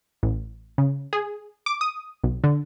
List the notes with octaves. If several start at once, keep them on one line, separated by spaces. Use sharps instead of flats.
A1
C#3
G#4
D6
D#6
B1
D3